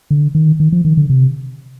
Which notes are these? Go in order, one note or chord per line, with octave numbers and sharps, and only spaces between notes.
D3
D#3
D#3
F3
D#3
D3
C3